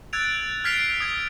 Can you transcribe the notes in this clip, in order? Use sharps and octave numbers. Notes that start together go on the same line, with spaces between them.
E6 F#6 G#6 A6 D7 F7
F6 G#6 B6 C7 D7 F7
D#6 G#6